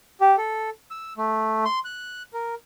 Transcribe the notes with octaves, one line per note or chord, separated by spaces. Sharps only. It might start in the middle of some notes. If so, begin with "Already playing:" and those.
G4
A4
E6
A3
C6
F#6
A#4